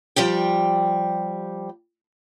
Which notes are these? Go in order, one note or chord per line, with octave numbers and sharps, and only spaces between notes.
F3 G3 G4 G5